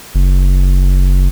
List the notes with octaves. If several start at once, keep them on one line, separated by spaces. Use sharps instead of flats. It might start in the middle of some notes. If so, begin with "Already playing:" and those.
F#1